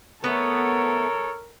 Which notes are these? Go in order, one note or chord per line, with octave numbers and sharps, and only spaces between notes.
A3 B3 A4 A#4 C#5